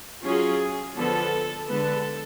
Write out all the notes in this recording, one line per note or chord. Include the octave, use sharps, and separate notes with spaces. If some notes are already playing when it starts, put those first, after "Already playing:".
F#3 C#4 F4 G#4
D3 F3 B3 A4
D3 G#3 B3 A4